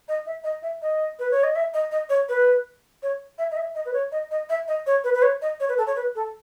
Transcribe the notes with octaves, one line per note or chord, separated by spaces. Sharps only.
D#5
E5
D#5
E5
D#5
B4
C#5
D#5
E5
D#5
D#5
C#5
B4
C#5
E5
D#5
E5
D#5
B4
C#5
D#5
D#5
E5
D#5
C#5
B4
B4
C#5
D#5
C#5
B4
A4
C#5
B4
A4